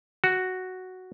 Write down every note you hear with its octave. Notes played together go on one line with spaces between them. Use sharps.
F#4